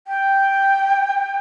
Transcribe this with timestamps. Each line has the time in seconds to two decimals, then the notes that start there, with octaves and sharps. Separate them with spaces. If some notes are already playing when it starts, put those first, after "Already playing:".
0.07 G5